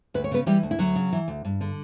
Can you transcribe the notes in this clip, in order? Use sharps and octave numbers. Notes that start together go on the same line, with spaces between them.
D2 B4
C#5
C#3 B3 B4
E3 G3 G4
D2
E4
D2 F#3 F#4
C#3
E3
D2
G2
D3